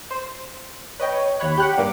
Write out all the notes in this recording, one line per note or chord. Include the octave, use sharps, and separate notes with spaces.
C5
B4 C#5 D#5 G5
D#2 C#5 B5 F#6
G4 F#5 F#6 G6
G2 A#3 D6